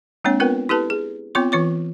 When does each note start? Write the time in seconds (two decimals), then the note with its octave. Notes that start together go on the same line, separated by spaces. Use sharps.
0.24 G#3 A#3 C4 D4 C#5
0.40 B3 C4 F4 A#4 B4 F#5
0.69 E4 G4 A4 B4 A5
0.90 G#4
1.35 B3 C4 F4 C#5 C6 D6
1.52 E3 F4 C#5 D6